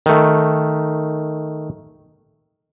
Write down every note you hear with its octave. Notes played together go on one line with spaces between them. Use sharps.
D#3 A3